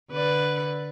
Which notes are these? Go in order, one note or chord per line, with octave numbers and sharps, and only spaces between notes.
D3 B4 D5